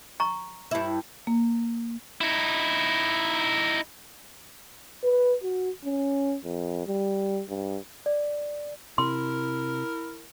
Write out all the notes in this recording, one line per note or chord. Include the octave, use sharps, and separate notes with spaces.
A#5 C#6
G2 E4
A#3
D#4 E4
B4
F#4
C#4
F2
G3
G2
D5
C3 E4 A#4 C6